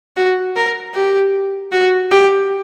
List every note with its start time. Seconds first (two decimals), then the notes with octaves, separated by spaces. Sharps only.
0.16 F#4
0.56 A#4
0.94 G4
1.72 F#4
2.11 G4